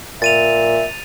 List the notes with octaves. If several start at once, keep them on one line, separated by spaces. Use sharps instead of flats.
A#2 E5 A6 D#7 F7